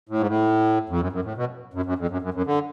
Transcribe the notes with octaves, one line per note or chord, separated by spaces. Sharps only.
A2
G#2
A2
F2
F#2
F#2
A2
B2
F#2
F#2
F2
F#2
F#2
F#2
D3